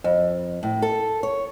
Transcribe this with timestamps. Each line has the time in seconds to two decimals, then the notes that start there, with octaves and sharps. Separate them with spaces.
0.04 F2
0.63 A2
0.82 A4
1.23 C#5